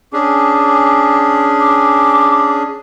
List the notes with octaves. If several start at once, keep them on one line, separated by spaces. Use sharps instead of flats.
C#4 D4 G#4 D6
D6